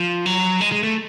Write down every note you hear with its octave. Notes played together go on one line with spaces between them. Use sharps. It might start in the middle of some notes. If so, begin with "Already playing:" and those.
Already playing: F3
F#3
G#3
G#3
A3